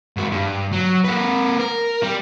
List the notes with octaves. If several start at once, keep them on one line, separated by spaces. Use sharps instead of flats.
G#2 F#4
G2
F#3
A#3 B4
A#4
G3